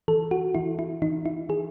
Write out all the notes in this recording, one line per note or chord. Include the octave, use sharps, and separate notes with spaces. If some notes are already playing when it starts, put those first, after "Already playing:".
E3 A4
F#4
E3 E4
E4
E3 D#4
E4
E3 G#4